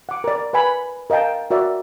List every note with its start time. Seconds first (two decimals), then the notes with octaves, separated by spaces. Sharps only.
0.09 F#5 D6
0.24 A#4 D5
0.53 B4 F#5 G#5 B5
1.10 A#4 D#5 F5 G5 A5
1.51 F#4 A#4 D5 E5